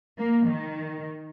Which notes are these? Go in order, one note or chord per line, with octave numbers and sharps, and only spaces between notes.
A#3
D#3